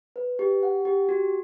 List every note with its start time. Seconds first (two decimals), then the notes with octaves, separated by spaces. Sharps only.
0.16 B4
0.39 G4
0.63 F#5
0.85 G4
1.09 F#4